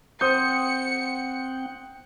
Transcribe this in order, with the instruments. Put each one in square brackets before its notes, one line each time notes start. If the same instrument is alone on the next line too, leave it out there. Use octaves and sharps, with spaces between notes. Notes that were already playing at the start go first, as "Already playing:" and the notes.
[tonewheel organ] C4 F#5 G5 [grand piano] C5 D#6 G6 [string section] C#7